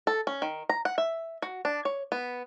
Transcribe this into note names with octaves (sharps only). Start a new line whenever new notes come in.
A4
C#4
D#3
A#5
F#5
E5
F#4
D4
C#5
B3